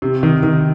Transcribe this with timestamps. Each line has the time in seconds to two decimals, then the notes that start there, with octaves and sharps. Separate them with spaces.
0.02 C3
0.23 D#3
0.43 D#3